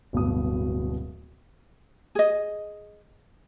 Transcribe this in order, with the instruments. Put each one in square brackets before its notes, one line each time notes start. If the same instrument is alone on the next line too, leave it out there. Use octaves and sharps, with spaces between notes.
[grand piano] D1 G2 B2 F#4 D#6
[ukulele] G#4 D#5